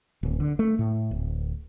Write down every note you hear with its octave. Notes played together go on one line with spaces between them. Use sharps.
D1
D3
A3
A2
D1